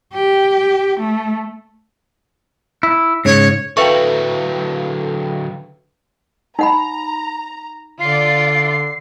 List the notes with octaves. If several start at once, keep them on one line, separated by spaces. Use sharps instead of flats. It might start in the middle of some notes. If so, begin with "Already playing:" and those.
G4
A3
E4
G#2 C#3 C#5
D3 F#3 A4 B4 E5 F5 G5 C#6
D#4 F#5 A#5 B5
D3 F4 D5 C7